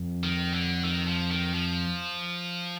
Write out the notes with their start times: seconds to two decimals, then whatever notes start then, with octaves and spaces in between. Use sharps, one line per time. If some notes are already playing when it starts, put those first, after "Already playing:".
Already playing: F2
0.23 D#3
0.54 D3
0.84 D#3
1.08 F3
1.31 D#3
1.54 F3